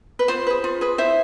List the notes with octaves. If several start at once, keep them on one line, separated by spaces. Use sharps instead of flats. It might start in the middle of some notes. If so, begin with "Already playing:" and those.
B4
F4 C5
G#4 B4
F4
G#4 B4
E4 C5 E5